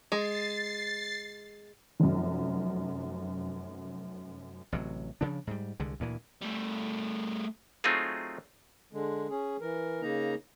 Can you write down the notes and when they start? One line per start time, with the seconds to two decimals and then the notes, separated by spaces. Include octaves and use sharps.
0.12 G#3 A6 C7
2.00 F1 F#2
4.72 A1 C3 F#3
5.21 C#3 F3 D4
5.47 G#2 G3
5.80 C2 D3 G#3
6.00 D2 A#2 E3
6.42 G3 A3
7.84 F#3 A3 C4 D#4 F4 G#4
8.93 D3 G#3
9.30 C#4 G#4
9.61 E3 A#4
10.02 C#3 A#3 D#4 A#5